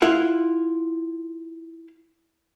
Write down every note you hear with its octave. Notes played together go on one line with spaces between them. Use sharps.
E4 F4 F#5